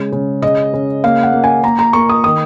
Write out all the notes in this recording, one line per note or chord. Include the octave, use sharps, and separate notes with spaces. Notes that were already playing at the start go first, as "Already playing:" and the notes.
Already playing: C#3 G#3
C#3
C#3 D#5
C#3
A#3 F5
F#5
A#3
G#5
A#3 A#5
A#5
A#3 C#6
D#6
D#3 D#6